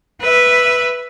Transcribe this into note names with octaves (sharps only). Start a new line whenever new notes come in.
B4 E5